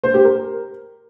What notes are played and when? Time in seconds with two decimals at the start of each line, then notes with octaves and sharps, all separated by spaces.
0.04 C5
0.14 G4
0.25 A#4